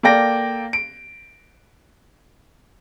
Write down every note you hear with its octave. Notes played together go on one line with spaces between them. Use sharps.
A#3 A4 D5 G5 A#6
D7